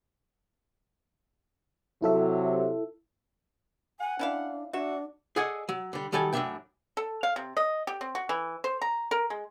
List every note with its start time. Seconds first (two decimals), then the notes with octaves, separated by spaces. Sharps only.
2.02 C3 F#3 E4 A4 E5
4.00 F#5 G#5
4.19 C#4 D4 E4 F5
4.73 D4 F#4 E5
5.36 G#4 A4 D5 D#5 F#5 G#5
5.69 F#3
5.93 D3 G3
6.12 D#3 F#3 G3 A4 G5 G#5
6.33 F#2 A2 F#3 D4 E5 G5
6.97 A4
7.23 F5
7.36 C3
7.57 D#5
7.87 G4
8.01 C4
8.15 F#4
8.29 E3
8.64 C5
8.82 A#5
9.11 A#4
9.30 G#3